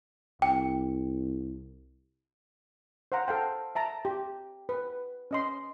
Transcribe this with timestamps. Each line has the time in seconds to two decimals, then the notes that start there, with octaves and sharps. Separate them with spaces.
0.42 C2 G5
3.12 C5 F5 F#5 A#5
3.28 A4 F5 G5
3.75 E5 A5 A#5
4.05 G4
4.69 B4
5.31 C#4 D#5 C6